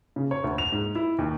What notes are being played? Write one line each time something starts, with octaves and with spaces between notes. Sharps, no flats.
C#3
C#5
D2
F7
G#2
E4
D#2